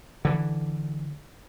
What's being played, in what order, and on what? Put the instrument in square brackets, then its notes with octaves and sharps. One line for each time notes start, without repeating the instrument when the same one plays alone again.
[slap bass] D3 E3